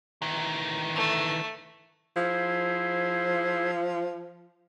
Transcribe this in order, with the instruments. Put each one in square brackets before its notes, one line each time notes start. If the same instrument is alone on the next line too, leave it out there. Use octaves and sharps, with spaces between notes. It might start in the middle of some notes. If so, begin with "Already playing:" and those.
[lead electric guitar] D#3 E3
[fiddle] A3
[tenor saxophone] F3 [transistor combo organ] E4 G#4 C5